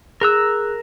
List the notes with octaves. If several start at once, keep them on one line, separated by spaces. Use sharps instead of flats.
G#4 A#4 A#5 E6 F#6